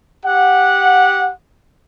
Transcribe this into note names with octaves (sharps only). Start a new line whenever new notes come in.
G4 F#5